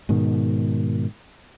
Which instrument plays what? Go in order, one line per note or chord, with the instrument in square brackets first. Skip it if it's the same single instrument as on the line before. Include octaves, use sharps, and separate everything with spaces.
[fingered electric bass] G#2 B2 D#3